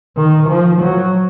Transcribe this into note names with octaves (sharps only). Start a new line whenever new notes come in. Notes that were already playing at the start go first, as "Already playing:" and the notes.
D#3
F3
F#3